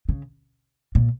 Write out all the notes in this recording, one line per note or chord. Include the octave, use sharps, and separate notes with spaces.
C#3
A#2